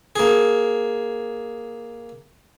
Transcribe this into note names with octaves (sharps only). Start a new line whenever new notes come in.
A#3 G#4